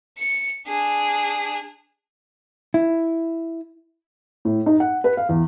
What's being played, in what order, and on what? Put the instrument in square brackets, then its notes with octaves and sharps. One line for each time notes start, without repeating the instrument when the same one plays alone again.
[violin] C#7
D4 G#4
[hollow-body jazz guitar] E4
[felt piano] A2
D#4
F#5
B4
F5
E2